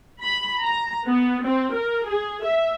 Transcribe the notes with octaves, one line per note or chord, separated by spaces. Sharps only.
B5
A#5
B3
C4
A#4
G#4
E5